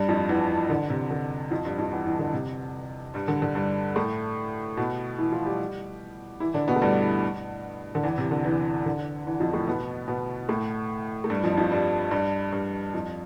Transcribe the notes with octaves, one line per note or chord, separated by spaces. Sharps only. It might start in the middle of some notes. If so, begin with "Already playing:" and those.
Already playing: G2 G3
F2 F3
E2 E3
D3
C3
D3
F2 F3
G2 G3
F2 F3
E2 E3
E2 E3
D3
C3
G2 G3
D3
D3
G2 G3
A2 A3
B2 B3
E3 E4
F3 F4
G3 G4
E3 E4
D3 D4
B2 B3
A3
G2 G3
D3
E2 E3
C3
D3
E2 E3
D3
E2 E3
F2 F3
A2 A3
B2 B3
B2 B3
A2 A3
A3
G2 G3
F2 F3
F2 F3
G2 G3
G2 G3
G2 G3
F2 F3